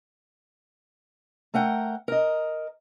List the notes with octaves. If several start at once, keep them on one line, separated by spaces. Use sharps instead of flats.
A3 A#4 F#5 G5
A#4 D#5